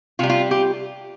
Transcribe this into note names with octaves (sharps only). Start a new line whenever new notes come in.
C3 G3 F4
F4
G4